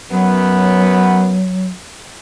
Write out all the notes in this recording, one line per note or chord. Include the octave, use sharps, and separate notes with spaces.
F#2 F#3 B3